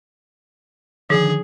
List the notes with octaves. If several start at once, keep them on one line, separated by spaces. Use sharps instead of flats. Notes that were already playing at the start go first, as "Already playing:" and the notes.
D3 D#3 F3 G#4